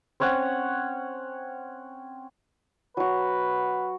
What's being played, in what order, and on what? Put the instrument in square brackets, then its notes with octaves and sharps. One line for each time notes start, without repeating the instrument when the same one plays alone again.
[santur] C4 C#4 C#5 F#5
[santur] F#3 F#4 [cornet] B4